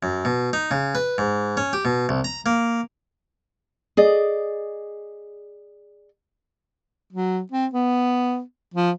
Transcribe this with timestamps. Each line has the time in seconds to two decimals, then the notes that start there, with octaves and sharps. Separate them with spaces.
0.03 F#2
0.25 B2
0.53 D#4
0.71 C#3
0.95 B4
1.18 G#2
1.57 C#4
1.73 G4
1.85 B2
2.09 C2
2.24 A#5
2.46 A#3
3.97 G#4 D5 D#5
7.12 F#3
7.51 C4
7.74 B3
8.74 F3